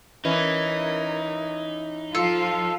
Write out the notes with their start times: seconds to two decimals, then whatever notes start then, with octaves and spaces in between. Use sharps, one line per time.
0.25 E3 C#4 D#4 A#4
2.15 F3 F4 A4 F5